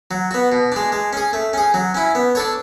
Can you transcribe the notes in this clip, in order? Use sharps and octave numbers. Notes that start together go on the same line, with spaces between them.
F#3
B3 F#4
B2
G#3 D4
G#3
C#4 G#4
A3
C#4 G#4
F#3
C#4 E4
B3
D4 A4 C#5